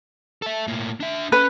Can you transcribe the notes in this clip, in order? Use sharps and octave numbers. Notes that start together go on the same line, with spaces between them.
A4 E5
A2 A#3
D4 E5
C#4 B4 F#6